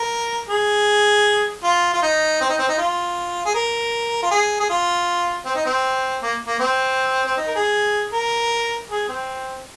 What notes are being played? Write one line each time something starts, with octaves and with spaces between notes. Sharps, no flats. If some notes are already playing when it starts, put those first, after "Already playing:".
Already playing: A#4
G#4
F4
F4
D#4
C4
D#4
C4
D#4
F4
G#4
A#4
F4
G#4
G#4
F4
C4
D#4
C4
A#3
A#3
C4
C4
D#4
A#4
G#4
A#4
G#4
C4